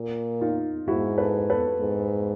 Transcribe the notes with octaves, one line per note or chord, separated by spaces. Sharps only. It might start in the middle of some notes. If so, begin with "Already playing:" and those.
Already playing: A#2
D#4 F4
G#2 E4 F#4
A4 B4
A4 B4
G#2